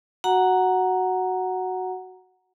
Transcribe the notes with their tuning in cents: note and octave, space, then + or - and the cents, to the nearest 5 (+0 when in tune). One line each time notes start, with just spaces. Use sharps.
F#4 +0 F#5 +0 A#5 +0